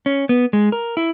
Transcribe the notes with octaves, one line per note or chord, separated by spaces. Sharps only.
C#4
B3
G#3
A#4
E4